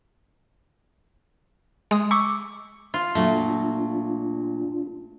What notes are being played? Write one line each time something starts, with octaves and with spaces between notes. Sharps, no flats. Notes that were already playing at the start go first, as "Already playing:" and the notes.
G#3 D#6
C#6 D6 E6 C#7
F4
A#2 F#3 A3 D4 F4 F#4